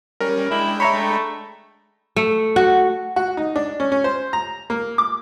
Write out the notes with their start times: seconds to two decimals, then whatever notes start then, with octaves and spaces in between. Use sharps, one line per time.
0.20 G3 C#4 A#4
0.51 G#3 D4 E4 G5
0.80 C#5 E5 A#5 B5
0.94 A3
2.16 A3
2.56 F#4
3.16 F#4
3.37 D#4
3.56 D4
3.80 C#4
3.92 C#4
4.04 C5
4.33 A#5
4.70 A#3
4.98 D6